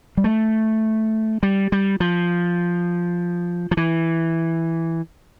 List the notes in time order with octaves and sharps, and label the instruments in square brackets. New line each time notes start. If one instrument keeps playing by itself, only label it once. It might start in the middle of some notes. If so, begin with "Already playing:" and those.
[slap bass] G3
A3
G3
G3
F3
F3
E3